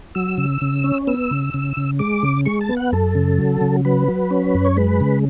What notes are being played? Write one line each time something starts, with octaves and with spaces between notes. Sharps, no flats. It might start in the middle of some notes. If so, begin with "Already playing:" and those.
F#3 E6
C#3
C#3
C#4
B3 E6
C#3
C#3
C#3
G#3 D6
C#3
G#3 C#6
A5
B3
F#5
F#2 A4
C#3
F#3
C#3
F#3 B4
F#3
C#4
F#2
C#5
G#3 B4
C#3